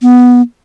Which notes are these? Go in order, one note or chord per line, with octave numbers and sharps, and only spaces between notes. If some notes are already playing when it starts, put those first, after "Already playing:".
B3